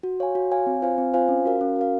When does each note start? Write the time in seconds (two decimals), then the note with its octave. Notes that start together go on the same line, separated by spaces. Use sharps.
0.03 F#4
0.20 C#5 F5 G#5
0.35 F#4
0.51 C#5 F5 G#5
0.67 C4
0.82 F4 C5 F5 G#5
0.98 C4
1.14 F4 C5 F5 G#5
1.29 C#4
1.45 F#4 A#4 F5
1.61 C#4
1.76 F#4 A#4 F5